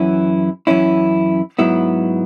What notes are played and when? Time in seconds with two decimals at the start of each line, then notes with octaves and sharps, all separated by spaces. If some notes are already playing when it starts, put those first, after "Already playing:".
Already playing: F#2 E3 C#4 E4
0.67 F#2 E3 C#4 E4
1.59 G#2 F#3 B3 E4